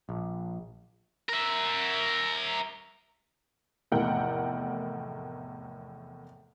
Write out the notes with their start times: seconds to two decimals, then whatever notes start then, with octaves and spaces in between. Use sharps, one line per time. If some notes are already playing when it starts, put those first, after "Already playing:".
0.09 A#1
1.29 A#4 E5
3.92 F1 E2 A2 A#4 F#5 G5